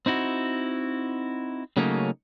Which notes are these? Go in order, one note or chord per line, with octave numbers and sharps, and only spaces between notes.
C4 D#4 E4 F#4
C#3 F#3 A3 A#3 C#4 D#4